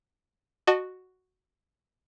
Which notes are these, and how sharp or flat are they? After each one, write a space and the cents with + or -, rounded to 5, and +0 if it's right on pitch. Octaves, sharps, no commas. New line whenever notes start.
F#4 +0 D#5 -35 A5 +5